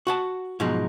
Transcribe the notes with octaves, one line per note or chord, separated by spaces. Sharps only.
F#4 F#5 A5
G#2 B2 F3 F#3 G#3 D#4